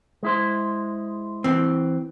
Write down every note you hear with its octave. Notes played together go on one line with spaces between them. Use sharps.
G#3 E4 C5
E3 C4